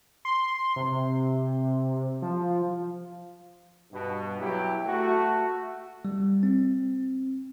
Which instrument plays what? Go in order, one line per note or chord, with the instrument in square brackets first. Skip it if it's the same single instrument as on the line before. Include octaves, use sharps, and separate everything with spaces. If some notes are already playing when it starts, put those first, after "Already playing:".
[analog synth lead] C6
C3
F3
[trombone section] G2 B2
B2 F#3 E4 G4
A3 F#4
[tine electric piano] G3
C4